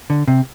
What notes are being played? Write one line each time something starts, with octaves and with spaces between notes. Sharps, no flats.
D3
C3